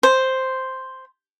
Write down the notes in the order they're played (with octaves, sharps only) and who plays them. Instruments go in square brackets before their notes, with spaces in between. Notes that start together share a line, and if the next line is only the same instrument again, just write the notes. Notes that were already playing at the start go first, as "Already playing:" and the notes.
[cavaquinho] C5